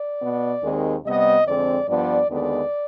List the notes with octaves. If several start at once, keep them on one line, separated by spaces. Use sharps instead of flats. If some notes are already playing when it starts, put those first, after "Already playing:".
Already playing: D5
B2 B3
D#2 D#3 G#3 C4
C3 G3 B3 D#5
F2 D3 G#3 C4 D5
G2 F3 B3 D5
D#2 D3 G#3 B3 D5